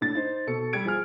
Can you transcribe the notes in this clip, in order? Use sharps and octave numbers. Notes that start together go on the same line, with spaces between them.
A2 D4 A6
D#4 C5
B2 A4 C#7
G3 G#6 D7
F3 G#4 F6